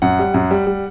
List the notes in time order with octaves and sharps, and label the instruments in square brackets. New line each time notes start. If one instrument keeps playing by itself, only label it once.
[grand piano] F#2 F#5
G3
F#2
G3
G3